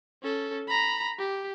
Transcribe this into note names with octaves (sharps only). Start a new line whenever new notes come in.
C#4 A4
A#5 B5
G4